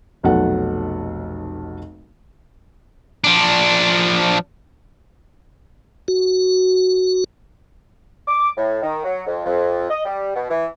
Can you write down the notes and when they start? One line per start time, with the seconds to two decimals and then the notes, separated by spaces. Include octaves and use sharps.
0.23 F1 B1 F#3 A4 F#5
3.24 F3 D4
6.08 F#4
8.28 D6
8.57 A2
8.82 D#3
9.04 F#3
9.27 F2
9.46 F2
9.90 D#5
10.05 G3
10.35 B2
10.50 E3